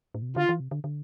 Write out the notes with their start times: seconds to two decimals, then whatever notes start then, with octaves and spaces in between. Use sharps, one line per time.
0.14 A2
0.22 B2
0.29 C3
0.36 D3 F4
0.49 E3
0.60 C3
0.71 D3
0.84 D3